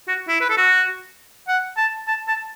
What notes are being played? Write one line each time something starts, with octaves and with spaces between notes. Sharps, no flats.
F#4
E4
B4
A4
F#4
F#5
A5
A5
A5